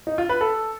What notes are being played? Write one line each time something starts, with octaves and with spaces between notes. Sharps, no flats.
D#4
F4
B4
A4